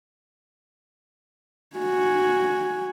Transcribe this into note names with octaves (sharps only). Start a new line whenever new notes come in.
F#4 G#5